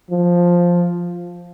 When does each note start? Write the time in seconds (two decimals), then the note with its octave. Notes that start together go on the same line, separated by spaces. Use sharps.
0.10 F3